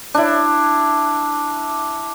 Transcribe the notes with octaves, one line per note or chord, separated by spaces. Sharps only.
D4 E4